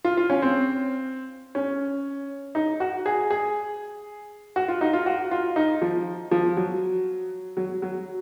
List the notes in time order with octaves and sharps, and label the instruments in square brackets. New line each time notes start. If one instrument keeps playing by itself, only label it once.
[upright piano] F4
F4
C#4
C4
C#4
D#4
F#4
G#4
G#4
F#4
F4
D#4
F4
F#4
F4
D#4
F3
F3
F#3
F#3
F#3